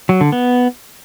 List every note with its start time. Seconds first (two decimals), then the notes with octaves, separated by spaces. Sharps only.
0.09 F#3
0.21 D3
0.32 B3